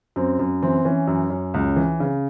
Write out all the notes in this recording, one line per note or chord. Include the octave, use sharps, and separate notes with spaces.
F#2 C4
F#2
E3 C4
E3 C#4
F#2
F#2
C#2
E3
C#3